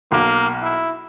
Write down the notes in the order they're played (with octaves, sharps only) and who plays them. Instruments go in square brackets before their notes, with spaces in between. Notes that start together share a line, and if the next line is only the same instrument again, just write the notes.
[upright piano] B1 [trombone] A#3
[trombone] E4